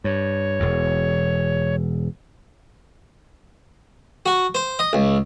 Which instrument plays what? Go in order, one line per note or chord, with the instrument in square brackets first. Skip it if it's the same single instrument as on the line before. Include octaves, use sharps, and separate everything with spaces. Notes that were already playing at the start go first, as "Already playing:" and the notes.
[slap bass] G2 [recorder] C#5
[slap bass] E1 E2
[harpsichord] F#4
C5
D#5
C#2